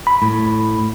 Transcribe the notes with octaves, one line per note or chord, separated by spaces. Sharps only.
B5
A2